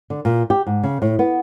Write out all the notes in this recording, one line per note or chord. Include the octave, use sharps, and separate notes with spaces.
D3
A#2
G4
G#2
C#3
A2
B3